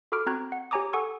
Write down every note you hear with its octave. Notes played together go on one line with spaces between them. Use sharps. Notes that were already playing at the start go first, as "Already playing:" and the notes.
F#4 A4 B5 D6 F6 D7
C4 F#4 A#5 F#6 G#6
F#5
G4 C#5 G#5 A#5 D6 D#6
A4 F#5 G#5 C#6 D#6 E6